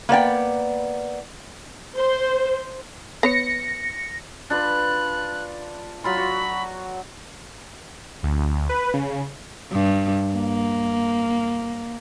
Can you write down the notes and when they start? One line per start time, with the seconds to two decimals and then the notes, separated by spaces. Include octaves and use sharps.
0.09 A#3 B3 D5 G5
1.95 C5
3.23 B3 C#5 A#6 C#7
4.50 D4 F4 B4 F#6
6.04 F#3 F4 B5 C6
6.17 F#4
8.23 D2
8.69 B4
8.94 C#3
9.72 G2
10.34 A#3